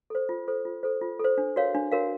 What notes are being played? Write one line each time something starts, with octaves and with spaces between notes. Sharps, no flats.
A4 C5
F4
A4 C5
F4
A4 C5
F4
A4 C5
D4
F#4 A#4 C#5 F5
D4
F#4 A#4 C#5 F5